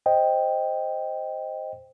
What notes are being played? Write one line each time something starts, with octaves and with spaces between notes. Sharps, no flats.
C5 D#5 G5